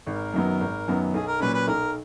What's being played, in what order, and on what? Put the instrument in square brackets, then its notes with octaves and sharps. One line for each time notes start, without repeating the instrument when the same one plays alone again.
[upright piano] G#1 [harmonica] A#4
[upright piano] F#2 D#3 F#3 B3
G#1
F#2 D#3 F#3 B3
[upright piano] B1 [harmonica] G#4
[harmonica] A#4
[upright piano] A#2 F#3 C#4 [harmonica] B4
[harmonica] B4
[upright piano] B1 [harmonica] A#4